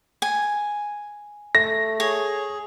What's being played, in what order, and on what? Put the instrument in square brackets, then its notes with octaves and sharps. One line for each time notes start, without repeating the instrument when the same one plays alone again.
[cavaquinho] G#5
[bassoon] A3 [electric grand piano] A#6
[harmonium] G#4 [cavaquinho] C#5